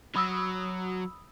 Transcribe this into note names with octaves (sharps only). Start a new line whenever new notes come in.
F#3 B5 D#6 E6